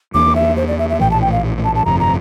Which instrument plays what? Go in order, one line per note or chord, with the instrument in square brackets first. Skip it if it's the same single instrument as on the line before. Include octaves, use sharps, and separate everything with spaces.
[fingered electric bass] E2 E3 A#3 D4 [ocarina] D6
[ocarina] E5
C5
D5
E5
E5
[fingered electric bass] A#1 A2 E3 [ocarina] G5
[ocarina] A5
G5
F5
A5
A5
[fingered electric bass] G1 F2 C3 [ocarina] A#5
[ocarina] A#5